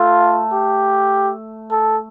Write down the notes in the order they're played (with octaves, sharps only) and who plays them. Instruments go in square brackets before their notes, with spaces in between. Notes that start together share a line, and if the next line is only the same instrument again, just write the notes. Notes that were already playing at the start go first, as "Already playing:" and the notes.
Already playing: [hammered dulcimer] A3 [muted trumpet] F4
[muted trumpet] G4
A4